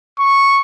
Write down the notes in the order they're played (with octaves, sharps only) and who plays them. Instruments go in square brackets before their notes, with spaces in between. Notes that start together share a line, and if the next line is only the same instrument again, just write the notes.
[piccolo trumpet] C#6